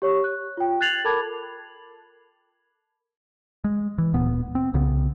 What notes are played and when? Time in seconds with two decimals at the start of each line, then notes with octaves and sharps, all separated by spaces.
0.02 G4 C#5 C#6
0.24 F#6
0.57 F4 G5
0.81 F#6 G#6 A6 C7 F7 F#7
1.04 A4 A#4 A5 B5 D6 G#6
3.64 G#3
3.98 E3
4.13 D1 A#2 B3
4.55 C4
4.74 C2 C#3 B3